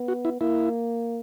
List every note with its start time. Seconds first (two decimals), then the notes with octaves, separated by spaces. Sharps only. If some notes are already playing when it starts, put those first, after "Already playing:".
Already playing: B3
0.08 F#4
0.25 E4
0.41 A#3 E4